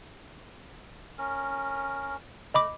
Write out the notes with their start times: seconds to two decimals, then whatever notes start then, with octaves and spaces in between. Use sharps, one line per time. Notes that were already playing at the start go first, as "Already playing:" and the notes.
1.19 C#4 A#4
2.54 A3 D#5 B5 D6